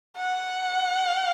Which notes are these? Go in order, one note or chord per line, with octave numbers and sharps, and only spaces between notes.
F#5